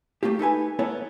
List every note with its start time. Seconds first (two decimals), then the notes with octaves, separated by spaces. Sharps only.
0.23 A3 A#3 F4 G4
0.39 D#4 A4 B4 G#5
0.79 A#3 B3 E4 A4 C#5